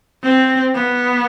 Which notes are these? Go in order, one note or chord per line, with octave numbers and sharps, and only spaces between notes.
C4
B3